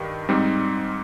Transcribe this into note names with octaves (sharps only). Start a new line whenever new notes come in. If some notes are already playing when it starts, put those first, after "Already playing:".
Already playing: G2 D#3 G4
G#2 G3 C4 D#4